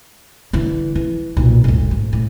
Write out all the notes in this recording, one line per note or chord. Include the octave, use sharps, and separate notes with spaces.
D3 E3
E3
B1 A#2
G#1 D2
G#2
A2